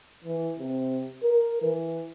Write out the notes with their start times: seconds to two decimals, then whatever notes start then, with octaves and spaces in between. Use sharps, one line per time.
0.25 E3
0.59 C3
1.23 A#4
1.62 E3